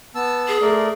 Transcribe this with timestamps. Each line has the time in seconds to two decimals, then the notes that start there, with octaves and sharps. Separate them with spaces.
0.15 B3 A5 E6
0.48 G#4
0.62 A3 A#4 D5